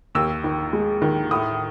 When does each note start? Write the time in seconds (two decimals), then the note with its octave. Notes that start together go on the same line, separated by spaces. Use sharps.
0.15 D#2 E6
0.44 D#3
0.73 G#3
1.02 D#3
1.31 A2 D#6